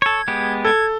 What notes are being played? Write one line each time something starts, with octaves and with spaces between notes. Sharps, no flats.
A4 C#5 G#6
G#3 B3 G4
A4 G#6